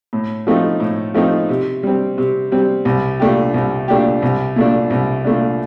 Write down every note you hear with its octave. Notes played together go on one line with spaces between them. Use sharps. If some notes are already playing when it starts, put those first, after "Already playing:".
A2
F3 A3 C4 D#4
A2
F3 A3 C4 D#4
C3
G3 C4
C3
G3 C4
C2
A#2 A3 D4 G4
C2
A#2 A3 D4 G4
C2
A#2 A3 D4
C2
A#2 A3 D4